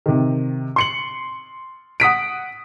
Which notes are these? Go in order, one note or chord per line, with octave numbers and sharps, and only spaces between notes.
C3 D#3
C6 C#7 F#7
F#5 D#6 B6 D7